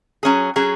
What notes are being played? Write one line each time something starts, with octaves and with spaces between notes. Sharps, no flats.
F#3 C#4 G#4
F#3 C#4 G#4